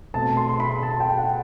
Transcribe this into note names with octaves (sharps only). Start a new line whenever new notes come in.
B2 A3 C4 A5
C6
C6
B5
A5
G5
F#5